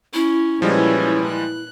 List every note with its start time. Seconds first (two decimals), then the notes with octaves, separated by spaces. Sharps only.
0.14 C#4 E4
0.62 A#2 E3 F3 G3 G#3 C#4
1.26 F#6